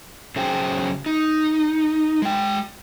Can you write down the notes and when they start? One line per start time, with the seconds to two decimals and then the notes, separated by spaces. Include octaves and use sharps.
0.36 C#3 F#3 G#4 C5 G5
1.06 D#4
2.22 G#3 G5